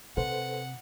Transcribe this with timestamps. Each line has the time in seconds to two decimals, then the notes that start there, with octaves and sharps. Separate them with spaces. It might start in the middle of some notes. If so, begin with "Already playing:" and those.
0.17 C3 A4 B4 C5 F#5